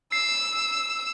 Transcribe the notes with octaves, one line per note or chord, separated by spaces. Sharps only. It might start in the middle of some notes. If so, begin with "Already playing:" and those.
E6 C7